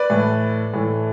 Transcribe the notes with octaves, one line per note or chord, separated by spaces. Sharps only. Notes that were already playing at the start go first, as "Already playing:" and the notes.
Already playing: B4 D5
A2 E3 A3
A2 E3 A3